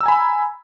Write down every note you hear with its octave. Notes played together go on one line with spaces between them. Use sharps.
G#5 A#5 B5 E6